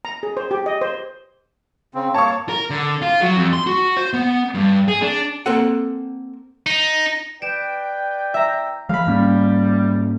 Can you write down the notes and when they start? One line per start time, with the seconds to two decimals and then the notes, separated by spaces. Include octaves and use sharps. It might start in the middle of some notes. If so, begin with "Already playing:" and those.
0.05 A#5
0.23 G#4
0.37 C5
0.51 G4
0.66 D#5
0.81 C5
1.95 C#3 C4
2.14 A#3 C#5 A5 C#6
2.49 A#4
2.70 D3
3.02 F4
3.21 F#3
3.37 F2
3.53 C6
3.67 F#4
3.97 C5
4.13 B3
4.55 G2
4.88 G#4
5.02 D4
5.46 A#3 C4 A4 F#5
6.66 D#4
7.42 B4 D5 G5 D7 E7
8.34 E5 A#5
8.89 E3 F3 G#3 F5 B5
9.07 G#2 G3 A#3 C#4